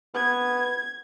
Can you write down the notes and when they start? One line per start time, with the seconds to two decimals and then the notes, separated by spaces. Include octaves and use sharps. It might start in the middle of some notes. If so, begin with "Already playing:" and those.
0.15 B3 G#6